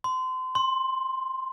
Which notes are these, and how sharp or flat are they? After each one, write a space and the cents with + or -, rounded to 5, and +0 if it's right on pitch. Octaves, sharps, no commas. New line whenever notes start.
C6 -30
C6 +10